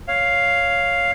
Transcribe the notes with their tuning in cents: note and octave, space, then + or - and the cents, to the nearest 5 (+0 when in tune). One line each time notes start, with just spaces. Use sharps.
C#5 +0 F5 +0